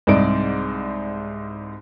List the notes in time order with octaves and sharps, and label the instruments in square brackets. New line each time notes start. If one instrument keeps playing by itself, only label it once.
[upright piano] C2 G#2 D#4 D5 D7